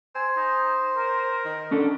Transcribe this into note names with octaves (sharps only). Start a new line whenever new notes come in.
C5 G#5
D#4
A#4
D#3
C#4 D4 A4